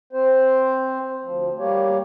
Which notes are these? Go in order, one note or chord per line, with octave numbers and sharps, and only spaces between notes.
C4 C5
D2 F3
G3 A#3 G4 C#5